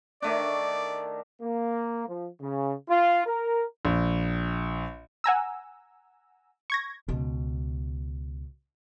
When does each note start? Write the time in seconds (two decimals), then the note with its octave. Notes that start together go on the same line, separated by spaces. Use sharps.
0.22 D#3 A3 D4 D5
1.42 A#3
2.08 F3
2.41 C#3
2.89 F4
3.27 A#4
3.85 A#1
5.24 F#5 G#5 A#5 E6
6.70 C#6 G#6 A#6
7.08 C#2 B2